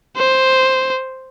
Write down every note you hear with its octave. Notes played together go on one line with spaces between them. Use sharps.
C5